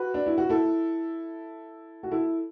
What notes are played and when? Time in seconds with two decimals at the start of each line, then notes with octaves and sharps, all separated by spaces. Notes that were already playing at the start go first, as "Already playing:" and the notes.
Already playing: F#4 B4
0.14 D4
0.26 E4
0.38 F#4
0.49 E4 A4
2.03 F#4
2.11 E4 A4